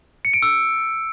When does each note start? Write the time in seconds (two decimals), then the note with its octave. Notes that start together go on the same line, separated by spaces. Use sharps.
0.25 C#7
0.34 D7
0.42 E6